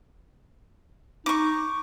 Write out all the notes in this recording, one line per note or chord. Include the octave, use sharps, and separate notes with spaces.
D#4 C#6 D6